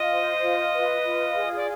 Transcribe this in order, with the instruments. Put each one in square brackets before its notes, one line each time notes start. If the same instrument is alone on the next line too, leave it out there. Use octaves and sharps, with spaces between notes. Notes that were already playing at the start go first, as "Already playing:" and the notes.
Already playing: [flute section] F4 [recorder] D#5
[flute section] C5
F4
B4
F4
G#4
[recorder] D5